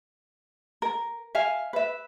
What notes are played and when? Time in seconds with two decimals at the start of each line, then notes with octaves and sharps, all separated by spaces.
0.82 A#4
1.35 E5 F5 G#5
1.73 B4 E5